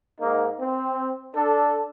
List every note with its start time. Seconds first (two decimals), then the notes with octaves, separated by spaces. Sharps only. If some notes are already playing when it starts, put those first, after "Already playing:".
0.20 G#2 A#3 D#4
0.60 C4
1.36 D4 A4